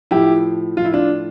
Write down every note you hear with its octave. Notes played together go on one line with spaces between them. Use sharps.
A2 F3 E4 G4
A2 F3 F4
E4
D4 F4